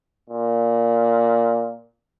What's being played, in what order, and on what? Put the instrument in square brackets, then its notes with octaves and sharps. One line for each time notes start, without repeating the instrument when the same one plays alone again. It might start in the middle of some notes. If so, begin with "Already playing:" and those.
[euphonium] A#2